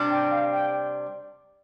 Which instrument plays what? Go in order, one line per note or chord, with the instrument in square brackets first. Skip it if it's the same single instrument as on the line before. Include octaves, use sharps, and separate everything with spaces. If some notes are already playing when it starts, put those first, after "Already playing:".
Already playing: [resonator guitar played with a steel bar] C3 G3 D4
[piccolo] G5
F5
G5